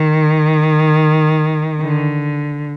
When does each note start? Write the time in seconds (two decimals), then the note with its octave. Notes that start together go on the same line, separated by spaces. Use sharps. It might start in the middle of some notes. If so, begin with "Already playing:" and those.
Already playing: D#3
1.81 D3